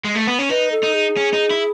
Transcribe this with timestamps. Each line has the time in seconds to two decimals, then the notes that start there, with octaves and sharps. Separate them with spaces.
0.05 G#3
0.15 A3
0.27 B3
0.39 C#4
0.49 D#4 B4
0.72 A4
0.83 D#4
0.94 G#4
1.17 C#4
1.33 D#4
1.50 E4